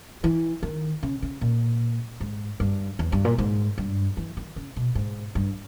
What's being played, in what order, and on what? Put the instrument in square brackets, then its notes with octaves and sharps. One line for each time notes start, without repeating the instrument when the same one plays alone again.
[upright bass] E3
D#3
C#3
C#3
A#2
G#2
G2
E2
G2
A#2
G#2
G2
E3
D#3
C#3
B2
G#2
G2